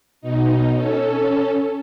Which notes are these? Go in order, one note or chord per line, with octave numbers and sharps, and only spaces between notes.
B2 D#4
C#4 A4